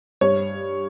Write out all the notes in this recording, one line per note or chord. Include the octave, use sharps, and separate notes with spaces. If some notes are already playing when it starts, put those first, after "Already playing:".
G2 C#5